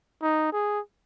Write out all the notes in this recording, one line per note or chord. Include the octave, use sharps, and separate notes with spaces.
D#4
G#4